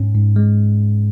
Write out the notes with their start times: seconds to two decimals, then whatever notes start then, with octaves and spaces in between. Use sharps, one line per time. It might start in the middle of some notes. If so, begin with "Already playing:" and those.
Already playing: G#2 C#4
0.14 G#2
0.36 G#3